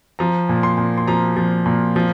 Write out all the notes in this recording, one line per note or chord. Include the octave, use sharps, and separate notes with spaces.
F3 A#5
A#2
C6
A#2
C6
F3 A#5
F3
A#2
F3